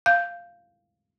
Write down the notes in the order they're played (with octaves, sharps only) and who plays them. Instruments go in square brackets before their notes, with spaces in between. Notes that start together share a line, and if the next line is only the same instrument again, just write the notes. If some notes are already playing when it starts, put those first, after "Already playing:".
[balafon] F5 [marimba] G6